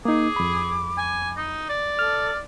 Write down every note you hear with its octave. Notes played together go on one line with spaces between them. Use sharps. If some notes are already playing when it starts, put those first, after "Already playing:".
A#3 D#4 G#4 D6
F2 B5
G#5
D#4
D5
A4 F6